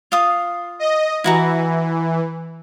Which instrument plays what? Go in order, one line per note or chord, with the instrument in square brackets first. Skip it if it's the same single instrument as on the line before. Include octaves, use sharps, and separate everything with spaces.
[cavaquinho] F4 F5 D#6
[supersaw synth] D#5
[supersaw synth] E3 [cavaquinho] E4 F#4 A#5